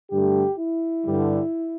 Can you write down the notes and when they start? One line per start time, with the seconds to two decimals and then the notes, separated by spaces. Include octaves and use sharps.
0.11 G2 D3 A3 G4
0.59 E4
1.06 G2 D3 G3